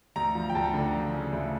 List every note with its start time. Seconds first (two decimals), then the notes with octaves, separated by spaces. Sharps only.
0.16 D2 A#5
0.35 F3
0.50 G5
0.55 D2 A5
0.74 D3
0.93 F3
1.13 C#3
1.32 D2 E5